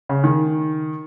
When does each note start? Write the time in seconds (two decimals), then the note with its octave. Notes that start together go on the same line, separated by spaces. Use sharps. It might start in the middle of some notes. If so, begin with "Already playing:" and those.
0.09 C#3
0.24 D#3